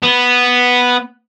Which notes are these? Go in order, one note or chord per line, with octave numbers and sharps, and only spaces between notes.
B3